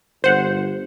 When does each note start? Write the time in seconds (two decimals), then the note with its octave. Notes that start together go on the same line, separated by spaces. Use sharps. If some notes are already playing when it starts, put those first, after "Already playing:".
0.24 G1 C5 F#5